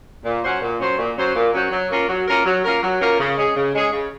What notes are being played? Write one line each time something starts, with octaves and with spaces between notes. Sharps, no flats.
A#2
F#3 C#4 F#4 C5
A#2
F#3 C#4 F#4 C5
A#2
F#3 C#4 F#4 C5
A#2
F#3 C#4 F#4 C5
F#3
A#3 C#4 F4 A#4
F#3
A#3 C#4 F4 A#4
F#3
A#3 C#4 F4 A#4
F#3
A#3 C#4 F4 A#4
C#3
G#3 C#4 G#4
C#3
G#3 C#4 G#4
C#3